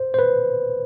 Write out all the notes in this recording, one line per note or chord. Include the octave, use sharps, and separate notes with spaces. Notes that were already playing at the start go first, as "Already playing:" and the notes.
Already playing: C5
C5
B4